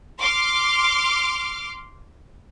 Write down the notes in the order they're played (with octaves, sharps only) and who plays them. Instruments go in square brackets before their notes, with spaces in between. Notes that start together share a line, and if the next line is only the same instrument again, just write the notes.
[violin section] C6 D6 F6